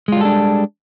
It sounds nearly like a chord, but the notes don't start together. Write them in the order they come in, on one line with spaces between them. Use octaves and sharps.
G#3 F4 G3 A4 D4